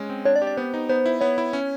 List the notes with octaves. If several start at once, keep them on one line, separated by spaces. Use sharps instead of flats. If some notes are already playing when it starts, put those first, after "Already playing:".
Already playing: G#3 C#4
C4
D4 C#5
D5
G4
D5
B3 C5
D#4
B3 C5
E4
B3 C#5
E4
C#4